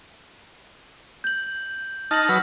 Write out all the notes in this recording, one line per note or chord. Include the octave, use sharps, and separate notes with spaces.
G6 F#7
D#4 A5 F6 A#6 F#7
F#3 B4 E6